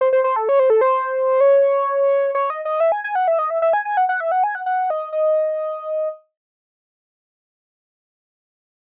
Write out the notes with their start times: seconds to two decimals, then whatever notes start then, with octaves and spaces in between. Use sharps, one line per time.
0.01 C5
0.13 C5
0.24 C5
0.36 A4
0.49 C#5
0.59 C5
0.70 A4
0.81 C5
1.40 C#5
2.35 C#5
2.50 D#5
2.65 D#5
2.80 E5
2.92 G#5
3.04 G#5
3.15 F#5
3.28 E5
3.39 D#5
3.50 E5
3.62 E5
3.73 G#5
3.85 G#5
3.97 F#5
4.09 F#5
4.20 E5
4.32 F#5
4.44 G#5
4.55 F#5
4.66 F#5
4.90 D#5
5.13 D#5